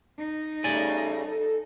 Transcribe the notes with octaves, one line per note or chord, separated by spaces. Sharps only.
D#4
C#3 G3 A3 D5 G#5
A4